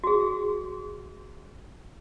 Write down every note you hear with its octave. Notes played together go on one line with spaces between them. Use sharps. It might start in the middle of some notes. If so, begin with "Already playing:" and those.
F#4 G#4